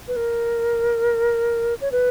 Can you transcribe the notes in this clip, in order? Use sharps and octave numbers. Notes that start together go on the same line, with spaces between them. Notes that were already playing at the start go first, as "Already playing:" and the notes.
B4
A#4
C#5
B4